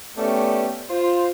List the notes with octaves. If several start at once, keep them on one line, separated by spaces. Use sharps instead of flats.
A3 B3 C#4 G4 D5
F4 C5